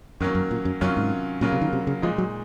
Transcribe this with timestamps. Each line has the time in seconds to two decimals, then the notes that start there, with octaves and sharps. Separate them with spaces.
0.20 F#2 D#3 F#3 A#3 C#4
0.35 F#2
0.51 A#2
0.65 F#2
0.81 F#2 C3 D#3 F#3 C#4 F4
0.97 G#2
1.41 A#2 C#3 F#3 A#3 F4
1.52 C3
1.61 D#3
1.73 C3
1.87 C#3
2.02 A#2 F3 G#3 D#4
2.18 F#3